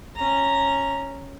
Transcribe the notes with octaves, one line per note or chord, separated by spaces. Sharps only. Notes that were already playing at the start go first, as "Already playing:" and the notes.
C#4 A#5